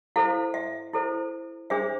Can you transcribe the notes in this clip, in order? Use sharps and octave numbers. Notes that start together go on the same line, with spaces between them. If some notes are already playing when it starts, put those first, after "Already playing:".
E4 A4 C5 F5
E5
E4 A4 C5
D4 G#4 C5 E5